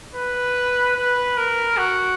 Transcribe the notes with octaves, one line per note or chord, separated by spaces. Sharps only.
B4
B4
A#4
F#4